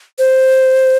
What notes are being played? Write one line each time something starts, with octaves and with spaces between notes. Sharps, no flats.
C5